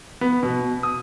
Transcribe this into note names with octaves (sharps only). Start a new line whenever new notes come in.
B3
B2
D#6